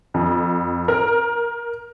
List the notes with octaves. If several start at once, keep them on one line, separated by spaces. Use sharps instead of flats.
F2
A#4